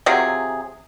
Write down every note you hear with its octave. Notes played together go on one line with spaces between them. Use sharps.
C3 F#3 F4 G#4